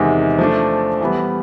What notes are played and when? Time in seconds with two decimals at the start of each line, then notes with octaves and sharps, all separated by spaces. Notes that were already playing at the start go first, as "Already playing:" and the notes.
Already playing: E2 C3 D#3 G#3
0.38 F3 A3 D4
1.01 E3 G3 B3